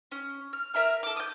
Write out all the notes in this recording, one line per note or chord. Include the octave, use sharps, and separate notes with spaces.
C#4
F6
A#4 E5 A#5 F6
A4 D6
D#6 G6